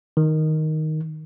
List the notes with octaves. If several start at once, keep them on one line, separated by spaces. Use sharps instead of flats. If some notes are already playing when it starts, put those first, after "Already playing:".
D#3